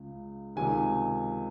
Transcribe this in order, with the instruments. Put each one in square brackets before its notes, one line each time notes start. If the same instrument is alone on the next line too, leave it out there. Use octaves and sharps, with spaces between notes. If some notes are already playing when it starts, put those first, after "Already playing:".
Already playing: [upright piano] C#2 C#3
C#2 C3 D#3 G#5